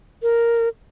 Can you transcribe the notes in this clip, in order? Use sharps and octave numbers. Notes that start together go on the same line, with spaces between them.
A#4